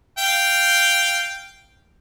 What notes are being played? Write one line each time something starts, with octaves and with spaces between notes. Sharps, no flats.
F5 G5